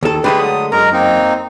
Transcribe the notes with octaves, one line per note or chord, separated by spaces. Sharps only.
D#2 A4
D3 G#3 A3 G4 B4
F#3 D#6
F#2 G#3 A#4 A#5
A#3 C4 D#4